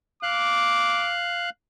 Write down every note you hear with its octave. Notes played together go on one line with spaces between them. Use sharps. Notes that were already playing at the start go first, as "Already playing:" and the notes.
F5 D6 F#6